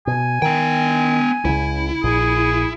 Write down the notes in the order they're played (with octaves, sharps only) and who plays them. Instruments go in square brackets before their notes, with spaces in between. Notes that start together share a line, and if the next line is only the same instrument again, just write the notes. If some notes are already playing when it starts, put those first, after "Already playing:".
[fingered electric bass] B2 [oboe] G#5
[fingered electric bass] D#3 [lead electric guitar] B3 G5
[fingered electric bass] C#2 C#3 [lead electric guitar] E4
[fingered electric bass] A#1 A#2 [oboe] G#4